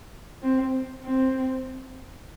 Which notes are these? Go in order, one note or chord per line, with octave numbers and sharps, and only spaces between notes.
C4
C4